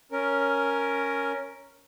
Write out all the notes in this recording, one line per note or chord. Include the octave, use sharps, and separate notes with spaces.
C#4 A#4